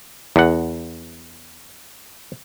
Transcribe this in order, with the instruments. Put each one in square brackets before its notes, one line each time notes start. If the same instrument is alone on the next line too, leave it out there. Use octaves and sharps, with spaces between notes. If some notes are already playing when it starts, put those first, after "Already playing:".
[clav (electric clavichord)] E2 F#5